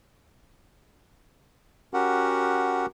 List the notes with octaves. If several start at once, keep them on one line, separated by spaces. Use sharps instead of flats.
C#4 F#4 G4 A#4 F#5